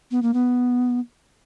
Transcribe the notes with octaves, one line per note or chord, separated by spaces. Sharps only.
B3
A#3
B3